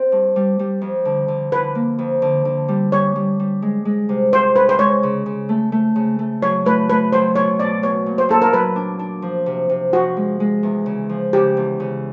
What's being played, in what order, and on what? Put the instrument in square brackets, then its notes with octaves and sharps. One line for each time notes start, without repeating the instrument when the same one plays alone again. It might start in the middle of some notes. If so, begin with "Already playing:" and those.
Already playing: [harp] C4
G2
G3
G3
F2
D3
D3
[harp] D3 [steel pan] B4
[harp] A#3
F2
D3
D3
G3
[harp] G3 [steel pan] C#5
[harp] G3
G3
G#3
G#3
C3
[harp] C3 [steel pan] C5
[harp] C#4 [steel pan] B4
[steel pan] C5
[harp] G#3 [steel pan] C#5
[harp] C#3
C#3
A3
A3
C#3
A3
[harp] F#3 [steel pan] C#5
[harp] A3 [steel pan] B4
[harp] A3 [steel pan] B4
[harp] F#3 [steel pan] C5
[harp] B2 [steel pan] C#5
[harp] B2 [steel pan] D5
[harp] B3 [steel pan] C#5
[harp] A#2
[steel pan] C5
[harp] A#2 [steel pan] A4
[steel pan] A#4
[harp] F#3 [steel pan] B4
[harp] D4
D4
F3
C3
C3
[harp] F3 [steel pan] F#4
[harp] G#3
G#3
E2
C#3
F3
[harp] C#3 [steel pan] G4
[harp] E2
C#3